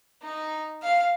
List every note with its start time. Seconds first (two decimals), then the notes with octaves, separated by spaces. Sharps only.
0.22 D#4
0.82 F5